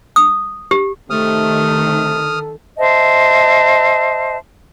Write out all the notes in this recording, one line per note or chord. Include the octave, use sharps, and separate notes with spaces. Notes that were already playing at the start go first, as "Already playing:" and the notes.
D#6
G4
C3 D#3 A3 A4 D#6 F6
C5 D#5 E5 A5